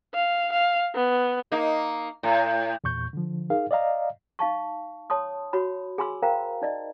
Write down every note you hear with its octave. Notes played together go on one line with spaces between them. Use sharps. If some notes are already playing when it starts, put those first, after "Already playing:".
F5
F5
B3
A#3 D#4
A2
E2 A#2 C#6 G6
D3 F3
D#4 G#4 A#4 F5
D5 D#5 F5 A#5
D#4 F5 A5 C#6
C#5 A5 C6 D#6
F#4 C#5 B5
G#4 G#5 B5 C6 E6
G#4 A#4 C5 F5 G5 A#5
D#4 D5 D#5